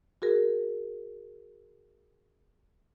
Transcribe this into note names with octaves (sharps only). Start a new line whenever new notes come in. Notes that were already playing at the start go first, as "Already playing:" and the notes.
F#4 G#4 A#4